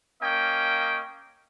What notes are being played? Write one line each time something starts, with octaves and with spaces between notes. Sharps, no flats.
A#3 C#4 D#5 G5